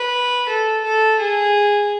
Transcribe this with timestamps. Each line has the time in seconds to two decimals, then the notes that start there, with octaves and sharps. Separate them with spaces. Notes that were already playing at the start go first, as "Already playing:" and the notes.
Already playing: B4
0.49 A4
0.84 A4
1.19 G#4